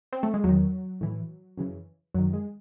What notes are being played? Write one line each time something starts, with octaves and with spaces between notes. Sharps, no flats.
C4
A3
G#3
E2 D#3 F#3
A2 E3
F#2 C#3 E3
F#2 D#3 F#3
G#3